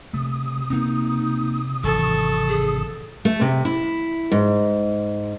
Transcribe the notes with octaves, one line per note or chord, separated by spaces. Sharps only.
C3 A3 D#6
A#3 C4 D#4
G#1 E3 F#3 A4 C#6
G#4
A3
C3
E4
G#2